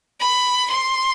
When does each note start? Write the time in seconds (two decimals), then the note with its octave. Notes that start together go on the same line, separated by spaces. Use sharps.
0.20 B5
0.70 C6